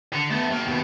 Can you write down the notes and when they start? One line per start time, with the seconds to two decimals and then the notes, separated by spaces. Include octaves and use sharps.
0.13 D3
0.30 A3 B3
0.50 F#3 A#3
0.66 D#2 B2